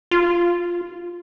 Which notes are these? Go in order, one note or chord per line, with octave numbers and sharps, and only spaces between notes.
F4